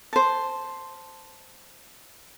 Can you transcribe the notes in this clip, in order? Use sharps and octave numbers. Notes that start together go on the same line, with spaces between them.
C5 A5